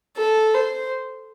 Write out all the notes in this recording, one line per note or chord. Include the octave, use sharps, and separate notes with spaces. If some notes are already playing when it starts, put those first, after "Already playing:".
A4
C5